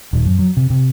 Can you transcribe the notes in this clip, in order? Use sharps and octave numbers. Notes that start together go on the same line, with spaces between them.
D#1
F#2
F#3
C3
C3